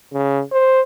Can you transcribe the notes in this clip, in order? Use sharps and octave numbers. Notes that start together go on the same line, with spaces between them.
C#3
C5